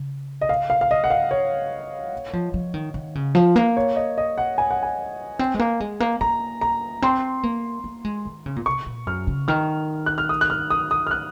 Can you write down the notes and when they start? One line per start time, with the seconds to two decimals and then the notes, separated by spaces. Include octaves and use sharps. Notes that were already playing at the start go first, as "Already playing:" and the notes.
Already playing: C#3
0.41 D#5
0.49 F5
0.70 F5
0.81 F5
0.91 D#5
1.04 F#5
1.10 F5
1.31 C#5
2.13 A#3
2.33 F3
2.54 F3
2.74 D#3
2.94 D#3
3.15 C#3
3.35 F3
3.56 A#3
3.77 C#5
3.96 D#5
4.18 D#5
4.38 F#5
4.58 G#5
4.71 F#5
4.83 G#5
5.39 C4
5.54 G#3
5.59 A#3
5.80 G#3
6.00 A#3
6.21 A#3 A#5
6.61 A#5
7.02 C4 C6
7.43 A#3
7.84 A#3
8.05 G#3
8.25 D#3
8.46 C#3
8.56 A#2
8.66 C3 C#6
8.86 A#2
9.07 F#2 F6
9.27 C#3
9.48 D#3 F6
10.06 F#6
10.18 F6
10.29 D#6
10.41 F#6
10.50 F6
10.70 D#6
10.91 D#6
11.07 F6
11.11 F#6